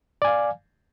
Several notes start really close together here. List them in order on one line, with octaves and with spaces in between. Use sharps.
D5 G#5 F5